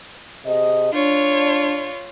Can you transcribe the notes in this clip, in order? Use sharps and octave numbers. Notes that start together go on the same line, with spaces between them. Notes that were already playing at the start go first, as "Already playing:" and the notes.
C3 G#4 D#5
D4 F4 C#5